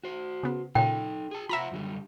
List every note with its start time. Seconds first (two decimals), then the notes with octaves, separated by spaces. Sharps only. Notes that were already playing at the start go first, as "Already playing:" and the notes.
0.04 F#4 C5
0.43 C#3 B3
0.75 A#2 C#3 D#4 A4 G5
1.31 G#4 A5
1.49 F4 C5 E5 F#5 A#5 B5
1.72 F#2 D3 G3